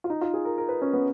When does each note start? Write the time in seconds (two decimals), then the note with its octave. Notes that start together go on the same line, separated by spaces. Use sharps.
0.04 F4
0.10 D#4
0.21 F4
0.34 G#4
0.45 A#4
0.58 A#4
0.69 B4
0.82 C#4
0.93 B3